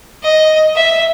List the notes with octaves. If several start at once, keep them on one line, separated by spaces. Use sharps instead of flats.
D#5
E5